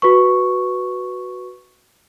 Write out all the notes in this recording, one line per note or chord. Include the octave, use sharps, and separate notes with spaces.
F#4 B4 C#6